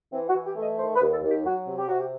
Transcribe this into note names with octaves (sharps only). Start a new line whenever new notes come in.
E3 C4
F#4
E3
G4
A3
D#5
D#3 C5
B4
D#2
A4
D#2
G4
F#3 F#4
C3
G4
C3 F#4
G4